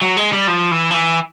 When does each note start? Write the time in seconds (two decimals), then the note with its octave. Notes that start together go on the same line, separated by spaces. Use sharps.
0.02 F#3
0.17 G#3
0.32 G3
0.47 F3
0.71 E3
0.91 F3
0.94 E3